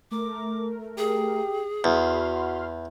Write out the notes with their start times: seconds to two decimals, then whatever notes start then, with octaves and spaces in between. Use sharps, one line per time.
0.11 A3 A#4 D6
0.98 G4 G#4
1.84 E2 F#4 B5 C6 F6